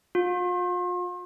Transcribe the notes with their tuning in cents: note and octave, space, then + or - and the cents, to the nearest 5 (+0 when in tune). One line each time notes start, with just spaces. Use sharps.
F4 +40